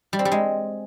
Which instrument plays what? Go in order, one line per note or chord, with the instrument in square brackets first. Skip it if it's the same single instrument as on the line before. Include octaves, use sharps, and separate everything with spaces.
[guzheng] G3
C4
G3
G#3